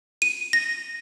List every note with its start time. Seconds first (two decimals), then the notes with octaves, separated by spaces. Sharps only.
0.22 D#7
0.53 A#6